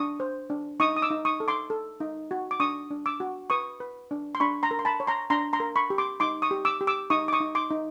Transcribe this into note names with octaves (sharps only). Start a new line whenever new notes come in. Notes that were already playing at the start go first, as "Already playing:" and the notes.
Already playing: D4 C#6 D#6
C5
D4
D#4 C#6 D#6
D#6
D6 E6
D#4
C#6 D#6
A4
C6 D6
A4
D#4
F#4
D6
D4 C#6 D#6
D4
D6 E6
F#4
B4 C#6 D#6
B4
D4
C6
D4 B5 C#6
A#5 C6
A#4
C6
A5 B5
C#5
A#5 C6
D4 A#5 C6
A#5 C6
A#4
B5 C#6
G4
C6 D6
D#4 C6 D6
C#6 D#6
G4
D6 E6
G4
D6 E6
D#4 C#6 D#6
D6
C#6 D#6
D#4
C6 D6
D#4